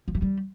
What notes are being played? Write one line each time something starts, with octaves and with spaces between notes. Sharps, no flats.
F3
E3
G3